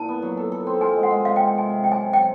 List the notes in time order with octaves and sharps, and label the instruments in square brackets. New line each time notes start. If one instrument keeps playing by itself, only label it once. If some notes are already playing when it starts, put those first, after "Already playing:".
Already playing: [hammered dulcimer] A#2 E4 [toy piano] A5
[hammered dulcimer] B3
F#3
A4
A4
C4
[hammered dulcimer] F4 [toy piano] G#5
[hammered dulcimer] G#3
[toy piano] F#5
[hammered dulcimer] G#3
[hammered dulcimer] C3 [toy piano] F5
[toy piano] G5
[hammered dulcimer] C3
[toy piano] G5
[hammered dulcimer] C3 [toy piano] G#5
[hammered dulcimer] C3
[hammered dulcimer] F#3 [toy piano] G5
[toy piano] G#5
[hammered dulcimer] C3
[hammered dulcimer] F#3 [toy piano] G5